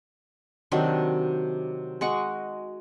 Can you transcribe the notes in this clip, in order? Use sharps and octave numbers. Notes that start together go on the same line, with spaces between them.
C3 D#3 F#3 D4
G#3 F#4 F#5 C#6